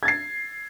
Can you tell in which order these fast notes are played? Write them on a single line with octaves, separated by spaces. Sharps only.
G#6 A6 C7